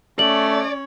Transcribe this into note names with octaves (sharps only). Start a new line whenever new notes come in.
A3 C#4 C#5 D5 F#7